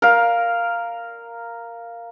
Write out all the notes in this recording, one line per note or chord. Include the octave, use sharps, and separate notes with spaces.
A#4 F5